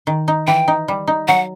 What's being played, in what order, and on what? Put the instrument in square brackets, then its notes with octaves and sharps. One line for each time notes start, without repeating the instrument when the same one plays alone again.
[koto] D#3
D#4
[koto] E3 [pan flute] G5
[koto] D#4
G3
D#4
[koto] F#3 [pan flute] F#5